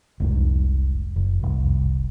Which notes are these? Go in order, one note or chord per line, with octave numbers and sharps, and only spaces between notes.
F1 C2 G#2
F#1
F1 C2